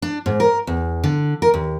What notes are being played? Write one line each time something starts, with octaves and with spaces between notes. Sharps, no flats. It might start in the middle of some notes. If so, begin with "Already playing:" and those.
D4
G#2
A#4
E2
D3
A#4
D#2